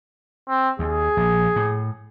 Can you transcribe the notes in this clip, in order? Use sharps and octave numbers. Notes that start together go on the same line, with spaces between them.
C4
D#2 G#4
A#1
A2